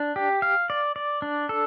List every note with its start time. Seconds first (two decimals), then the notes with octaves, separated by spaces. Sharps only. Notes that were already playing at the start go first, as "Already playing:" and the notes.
Already playing: D4
0.16 G4
0.42 F5
0.70 D5
0.96 D5
1.22 D4
1.49 A4